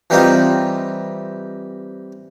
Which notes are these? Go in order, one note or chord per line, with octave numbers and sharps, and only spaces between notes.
E3 G3 C4 D#4 F4